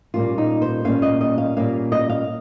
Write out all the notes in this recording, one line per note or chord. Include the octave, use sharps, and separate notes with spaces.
A#2 G3 A#3 C#4 F4
D#4
C5
A#2 G3 A#3 C#4 F5
D#5
D#5
F5
A#2 G3 A#3 C#4 F5
D#5
F5